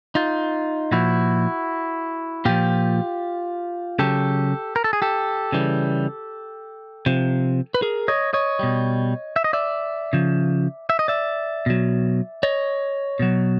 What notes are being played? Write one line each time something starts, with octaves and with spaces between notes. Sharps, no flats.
D#4 F4
A#2 F3 E4 F#4
A#2 F3 F4 G4
C#3 F#3 G4 A4
A#4
A4
G#4
G4 A4
C#3 E3 G3
C3 F3
B4
G#4 A#4
C#5 D#5
C#5 D#5
B2 G3
E5
D#5
D5 E5
C#3 F3
E5
D#5
D5 E5
B2 F#3
C#5 D#5
B2 F#3